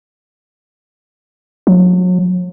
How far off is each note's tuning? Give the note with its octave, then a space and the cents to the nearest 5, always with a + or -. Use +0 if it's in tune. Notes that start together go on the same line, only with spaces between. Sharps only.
F#3 -35